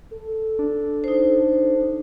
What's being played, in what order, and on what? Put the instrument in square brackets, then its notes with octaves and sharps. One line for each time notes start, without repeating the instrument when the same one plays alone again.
[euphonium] A4
[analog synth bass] D4
[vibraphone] D#4 C5